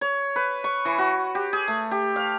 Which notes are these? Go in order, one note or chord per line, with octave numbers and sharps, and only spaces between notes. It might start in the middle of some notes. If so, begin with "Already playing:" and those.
C#5
B4
C#6
E3
F#4
G4
G#4
A3
G4
F5